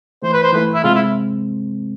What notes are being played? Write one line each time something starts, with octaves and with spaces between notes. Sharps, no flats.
E3 A3 E4 C5
B4
C5
E3 A3 E4 B4
E4
C3 G#3 C4 F4
E4